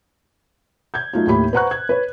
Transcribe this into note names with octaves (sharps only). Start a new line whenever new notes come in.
G6 G#6
F#3 A3 D#4 F4
D#2 A2 G4 B5
B4 C5 F#5 A#5 C#6 F#6
G#6
B4 C#5